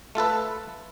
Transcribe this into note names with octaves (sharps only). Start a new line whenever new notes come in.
A3 F4 A4 B4